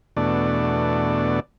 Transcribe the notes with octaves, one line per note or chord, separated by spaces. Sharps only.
E2 B2 A3 D4 D5